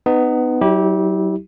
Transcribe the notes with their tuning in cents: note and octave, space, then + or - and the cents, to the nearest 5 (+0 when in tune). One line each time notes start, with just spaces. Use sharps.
B3 +20 D#4 -20
F#3 +30 E4 -40 G4 -5